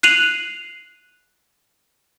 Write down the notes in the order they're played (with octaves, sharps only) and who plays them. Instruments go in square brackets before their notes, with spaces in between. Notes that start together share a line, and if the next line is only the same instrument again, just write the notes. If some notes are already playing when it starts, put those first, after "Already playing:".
[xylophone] F#6 C7 D#7 F7 F#7